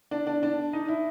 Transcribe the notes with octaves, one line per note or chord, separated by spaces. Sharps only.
D4
D4
D4
D#4
E4